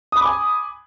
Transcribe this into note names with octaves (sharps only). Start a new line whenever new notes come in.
G#5 B5 D6 D#6